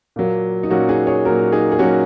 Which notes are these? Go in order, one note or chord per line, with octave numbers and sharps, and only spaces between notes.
A#2 F#3 A#3
D#4
A#2 F#3 A#3 C#4 F#4
D#4 G#4
G#4 C#5
A#2 F#3 A#3 F#4 A#4
D#4 G#4
G#4
A#2 F#3 A#3 C#4 F#4